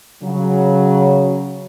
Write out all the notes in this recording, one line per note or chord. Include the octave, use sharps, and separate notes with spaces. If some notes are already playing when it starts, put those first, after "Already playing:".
C#3 F#3